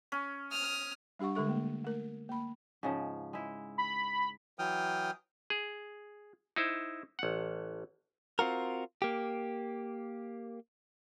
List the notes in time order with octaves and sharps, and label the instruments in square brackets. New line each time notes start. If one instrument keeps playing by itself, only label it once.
[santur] C#4
[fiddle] D#6 F6
[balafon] G3 D4 G4 F#5 C#6
D3 G#3 A4 C#6
A3 A#3
A3 A#4
A#3 B5
[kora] G#2 C#3 F3
G#3 E4
[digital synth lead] B5
[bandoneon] E3 F#3 G5 D#6 F6
[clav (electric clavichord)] G#4
D#4 E4 C5
A1 F#5
[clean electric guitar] C4 F4 F#4 A#4
A#3 G4